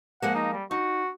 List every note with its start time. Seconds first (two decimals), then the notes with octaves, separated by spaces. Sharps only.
0.22 F3 G#3 A#3 F#5
0.35 D#4
0.53 G3
0.71 D#4 F#4